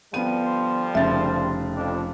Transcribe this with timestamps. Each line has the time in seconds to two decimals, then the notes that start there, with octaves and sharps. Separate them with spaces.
0.14 D3 F3 G3 B3 D#7
0.45 C5
0.95 F1 C#3 C5 E5 A6
1.76 F2 D4